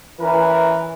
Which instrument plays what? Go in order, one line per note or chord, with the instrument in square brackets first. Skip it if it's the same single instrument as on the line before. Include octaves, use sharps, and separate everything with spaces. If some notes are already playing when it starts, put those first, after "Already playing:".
[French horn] E3 [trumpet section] C#4 A#4 B4